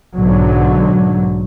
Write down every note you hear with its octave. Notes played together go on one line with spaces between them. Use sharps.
B1 G#2 D3 F#3